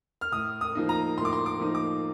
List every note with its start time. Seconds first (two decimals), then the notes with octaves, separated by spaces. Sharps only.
0.21 F6
0.32 A2 D#6
0.61 D#6
0.75 F3 A#3 D#4
0.89 A#5
1.18 A2 C6
1.25 D6
1.33 C6
1.46 D6
1.60 F3 A#3 D#4
1.75 D6